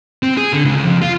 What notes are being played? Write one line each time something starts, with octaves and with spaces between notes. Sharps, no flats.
C4
G#4
D3
C#2
F2
F4